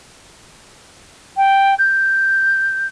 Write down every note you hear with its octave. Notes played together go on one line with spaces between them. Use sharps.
G5
G6